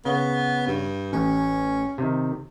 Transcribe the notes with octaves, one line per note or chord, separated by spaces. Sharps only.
C#3 B3
G2
A1 C#4
C3 D#3